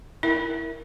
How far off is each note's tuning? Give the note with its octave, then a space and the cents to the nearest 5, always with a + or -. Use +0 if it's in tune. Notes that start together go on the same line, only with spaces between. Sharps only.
E4 +0 A#4 +0 E5 +0